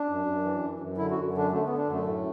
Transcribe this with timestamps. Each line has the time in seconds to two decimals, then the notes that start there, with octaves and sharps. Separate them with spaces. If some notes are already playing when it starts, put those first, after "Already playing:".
Already playing: D4
0.09 F#2
0.26 F#2
0.44 E3
0.63 F#2
0.80 F#2
0.97 D3 E4
1.11 F#4
1.16 F#2
1.34 D3 D4
1.51 D3 A3
1.65 D3 B3
1.78 D4
1.87 F#2 A3
2.06 A2